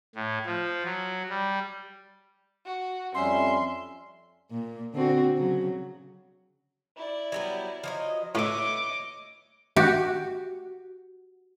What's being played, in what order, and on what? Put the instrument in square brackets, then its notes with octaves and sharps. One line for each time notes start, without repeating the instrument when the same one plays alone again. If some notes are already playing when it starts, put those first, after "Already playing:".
[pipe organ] A2
F3
F#3
G3
[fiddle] F#4
[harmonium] F2 G3 C#4 [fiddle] E5 [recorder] C6
[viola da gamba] A#2
D3 C4 F#4
C#3 F#3
[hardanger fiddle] E4 D5
[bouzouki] F#3 G3 B3
F3 F#3 D#5
[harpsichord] A2 [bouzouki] B4 E5 [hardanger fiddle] C#5 D#5 [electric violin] D6
[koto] F#4 G4